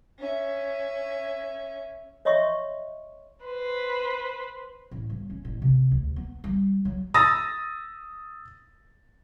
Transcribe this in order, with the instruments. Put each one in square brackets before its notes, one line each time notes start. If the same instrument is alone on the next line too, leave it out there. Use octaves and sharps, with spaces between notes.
[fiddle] C#4 E5
[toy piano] C#5 D#5 E5 C6 C#6
[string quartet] B4 C5
[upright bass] A1
G1
C#4
A1
C3
D2
B3
G3
F#3
[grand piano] D#6 E6 A6 A#6